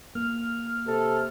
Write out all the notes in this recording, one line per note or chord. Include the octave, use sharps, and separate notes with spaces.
A#3 F6
C3 A4